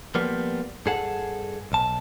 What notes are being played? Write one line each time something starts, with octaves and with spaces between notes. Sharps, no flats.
F3 G3 A#3 B3
G2 G#4 A4 F#5
B1 A5